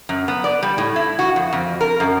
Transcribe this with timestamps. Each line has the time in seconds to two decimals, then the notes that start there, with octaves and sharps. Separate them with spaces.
0.09 F#2
0.28 B3
0.44 D5
0.63 G3
0.78 A2
0.96 E4
1.19 F#4
1.36 F2
1.53 F2
1.81 A#4
2.00 F#2